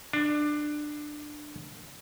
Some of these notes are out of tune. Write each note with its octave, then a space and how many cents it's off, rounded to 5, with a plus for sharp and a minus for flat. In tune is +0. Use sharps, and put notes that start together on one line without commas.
D4 +20